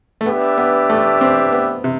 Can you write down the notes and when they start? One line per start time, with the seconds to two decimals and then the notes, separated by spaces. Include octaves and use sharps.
0.21 A3
0.26 B3 D4 G4 B4 E5
0.58 B3
0.90 A3
1.21 C4
1.52 B3
1.84 C3